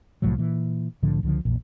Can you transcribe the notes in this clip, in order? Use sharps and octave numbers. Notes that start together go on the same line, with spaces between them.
C2 A2 F3 F#3
A#2 E3
C2 A2 D3 F3
C#2 D3 F3
A#1 E2 A#2